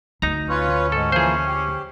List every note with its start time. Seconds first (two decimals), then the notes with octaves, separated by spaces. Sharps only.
0.22 D2 D#4 A#5
0.49 C#4 F4 B4 C#5
0.92 G#2 A4
1.12 E3 F3 A#3 G#4 C5
1.46 G4